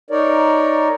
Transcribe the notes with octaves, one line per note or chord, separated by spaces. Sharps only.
D#4 A#4 C#5 D5